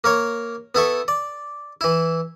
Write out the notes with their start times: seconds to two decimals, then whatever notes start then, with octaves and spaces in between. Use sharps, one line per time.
0.04 A#3 A#4 C#5
0.75 B3 E4 A4 C#6
1.08 D5
1.81 E3 E4